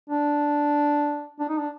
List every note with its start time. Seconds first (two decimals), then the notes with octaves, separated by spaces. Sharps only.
0.10 D4
1.39 D4
1.49 D#4
1.58 D4